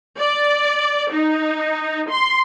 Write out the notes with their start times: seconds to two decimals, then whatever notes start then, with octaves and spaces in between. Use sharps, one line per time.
0.19 D5
1.11 D#4
2.10 C6